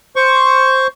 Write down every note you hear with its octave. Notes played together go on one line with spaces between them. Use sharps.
C5 C#6